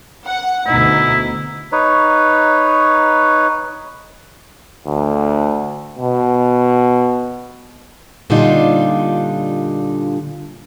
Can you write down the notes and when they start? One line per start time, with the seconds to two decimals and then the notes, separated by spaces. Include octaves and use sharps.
0.25 F#5
0.66 D2 B2 D#4 E4
1.72 D#4 B4 C#5
4.87 D2
5.99 B2
8.30 A#2 D3 G3 D4 D#4 F4